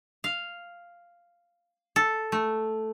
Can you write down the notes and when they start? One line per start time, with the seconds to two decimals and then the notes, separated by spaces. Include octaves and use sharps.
0.24 F5
1.96 A4
2.32 A3